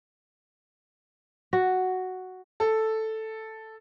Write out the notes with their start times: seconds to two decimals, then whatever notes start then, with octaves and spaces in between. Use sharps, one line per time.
1.53 F#4
2.60 A4